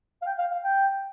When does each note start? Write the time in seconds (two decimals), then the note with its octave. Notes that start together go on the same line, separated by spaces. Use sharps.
0.22 F5
0.26 G5
0.38 F5
0.51 F5
0.64 G5